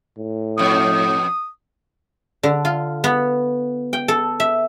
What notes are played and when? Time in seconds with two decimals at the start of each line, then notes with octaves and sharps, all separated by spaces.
0.17 A2
0.58 F2 B2 D#6
2.43 D3
2.65 F4
3.04 B3
3.93 G5
4.08 A4
4.40 E5